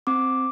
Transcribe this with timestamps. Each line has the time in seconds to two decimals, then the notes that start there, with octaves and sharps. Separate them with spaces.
0.07 C4 D6